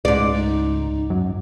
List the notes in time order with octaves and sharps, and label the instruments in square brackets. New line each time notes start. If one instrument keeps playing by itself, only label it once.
[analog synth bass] C#2 [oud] G#2 D5
[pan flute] D#4
[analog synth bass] F#2